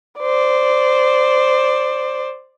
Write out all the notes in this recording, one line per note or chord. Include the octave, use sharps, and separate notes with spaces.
C5 D5